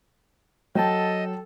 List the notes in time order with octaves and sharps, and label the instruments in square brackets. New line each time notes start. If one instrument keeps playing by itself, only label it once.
[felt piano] F#3 [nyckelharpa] A4 [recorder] D#5 [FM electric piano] G5 A5